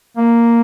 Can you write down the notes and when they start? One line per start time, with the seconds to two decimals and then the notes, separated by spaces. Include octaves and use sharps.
0.17 A#3